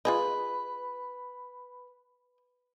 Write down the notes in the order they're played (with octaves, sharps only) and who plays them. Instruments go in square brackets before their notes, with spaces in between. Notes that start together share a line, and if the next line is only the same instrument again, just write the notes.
[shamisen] F4 G#4 D#5 [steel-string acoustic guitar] B4